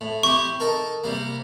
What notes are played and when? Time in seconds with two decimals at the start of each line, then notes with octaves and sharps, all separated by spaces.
0.01 A2
0.23 C4 E4 G4 C#6
0.60 D#4 A4 A#4
1.04 C3 G3 A#3